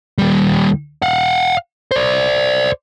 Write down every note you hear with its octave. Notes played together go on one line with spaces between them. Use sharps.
D#2 G3
F5 F#5
C5 D5